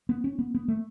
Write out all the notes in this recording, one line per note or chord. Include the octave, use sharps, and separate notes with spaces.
B3
C#4
B3
B3
A3